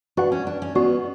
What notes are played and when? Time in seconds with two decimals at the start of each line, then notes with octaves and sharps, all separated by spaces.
0.17 D4 F#4 B4 F#5
0.32 C#4
0.47 D4
0.62 C#4
0.75 B3 C#4 F#4 B4 D5